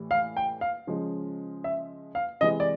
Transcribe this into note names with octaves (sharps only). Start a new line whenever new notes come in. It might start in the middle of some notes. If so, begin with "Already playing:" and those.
Already playing: A2 E3 G3
F5
G5
F5
C#3 F3 G#3
E5
F5
C3 E3 G#3 D#5
D5